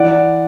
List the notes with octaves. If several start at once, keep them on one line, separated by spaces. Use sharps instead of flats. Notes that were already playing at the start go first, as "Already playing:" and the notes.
Already playing: E3 D5 F#5